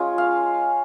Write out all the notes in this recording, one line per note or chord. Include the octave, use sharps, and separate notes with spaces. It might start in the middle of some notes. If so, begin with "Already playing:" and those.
Already playing: G#3 C#4 F4
F5